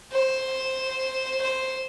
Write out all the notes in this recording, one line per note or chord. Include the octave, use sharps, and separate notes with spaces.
C5
C5